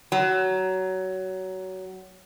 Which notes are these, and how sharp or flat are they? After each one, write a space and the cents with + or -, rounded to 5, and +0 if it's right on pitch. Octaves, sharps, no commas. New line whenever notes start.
F#3 +20